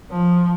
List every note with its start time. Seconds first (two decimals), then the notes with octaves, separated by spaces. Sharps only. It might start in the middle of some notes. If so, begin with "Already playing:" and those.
0.11 F3